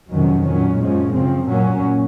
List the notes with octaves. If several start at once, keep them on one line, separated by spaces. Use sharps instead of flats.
F2 C3 D#3 F#3 C#4
A#2 F#3 C#4
F#2 F3 G#3 C#4
C#3 F3 C4
A#2 F#3 A#3 C#4